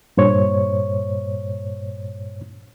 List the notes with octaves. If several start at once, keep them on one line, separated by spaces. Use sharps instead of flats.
G2 A#2 C5 C#5